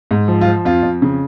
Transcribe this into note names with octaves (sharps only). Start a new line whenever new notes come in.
G#2
F3
F4
F3
F2 F4
F2
C#3